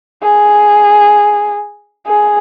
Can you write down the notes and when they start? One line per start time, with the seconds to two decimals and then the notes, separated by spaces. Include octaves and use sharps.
0.22 G#4
2.07 G#4